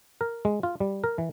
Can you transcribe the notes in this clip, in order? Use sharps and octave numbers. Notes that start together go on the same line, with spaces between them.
A#4
G#3
F4
G3
A#4
E3